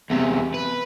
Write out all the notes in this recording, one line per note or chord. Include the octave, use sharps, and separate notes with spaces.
E2 C3
B4